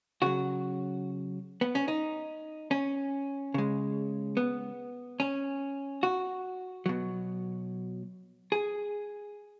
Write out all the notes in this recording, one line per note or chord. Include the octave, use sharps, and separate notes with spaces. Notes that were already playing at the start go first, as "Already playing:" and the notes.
C#3 F#3 F#4
B3
C#4
D#4
C#4
C#3 G#3
B3
C#4
F#4
B2 F#3
G#4